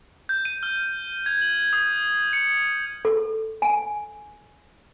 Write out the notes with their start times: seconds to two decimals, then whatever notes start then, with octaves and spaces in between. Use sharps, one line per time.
0.29 G6
0.45 D#7
0.63 F6
1.26 G#6
1.42 F#7
1.73 D#6
2.33 C#7
3.05 A4
3.62 G#5